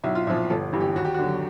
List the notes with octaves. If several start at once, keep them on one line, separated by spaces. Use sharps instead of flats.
B1 E4
F4
A#2 F3 E4
G1 A4
G2 E3
G4
D#2 F#4
G4
F#4
D3 F#3